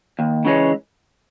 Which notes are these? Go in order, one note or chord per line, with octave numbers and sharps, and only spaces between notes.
D#2
C#3 E3 G#3 C#4